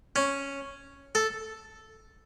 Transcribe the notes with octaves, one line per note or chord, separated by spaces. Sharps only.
C#4
A4